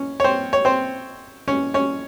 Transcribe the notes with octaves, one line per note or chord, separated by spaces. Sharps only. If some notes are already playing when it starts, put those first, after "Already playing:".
Already playing: C#4
C#5
C4 C5
C#5
C4 C5
C#4 C#5
C#4 C#5